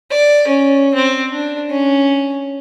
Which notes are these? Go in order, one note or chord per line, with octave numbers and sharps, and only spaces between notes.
D5
C#4
C4
D4
C#4